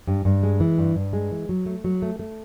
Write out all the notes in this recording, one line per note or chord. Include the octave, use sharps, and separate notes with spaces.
G2
G2
G#3
E3
G2
G2
G#3
E3
F#3
A3
F#3
A3
A3